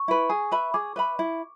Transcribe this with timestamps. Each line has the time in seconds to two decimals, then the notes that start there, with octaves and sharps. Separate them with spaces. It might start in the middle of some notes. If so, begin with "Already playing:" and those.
Already playing: C#6
0.08 E4 B4
0.29 G#4
0.51 B4 E5 B5
0.74 G#4 D6
0.96 B4 E5 B5
1.19 E4